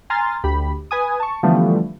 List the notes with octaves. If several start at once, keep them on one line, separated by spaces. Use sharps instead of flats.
G#5 A#5 C6 F6 A6
D2 G4 B5
B4 G#5 D#6
A5 C#6
D3 E3 F3 G3 A3 B3